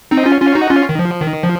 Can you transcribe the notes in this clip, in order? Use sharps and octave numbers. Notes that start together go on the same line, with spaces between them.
C4 D#4
C#4 F4
C#4 F4
D#4 F#4
C#4 F4
D#3
F3
D#3
F3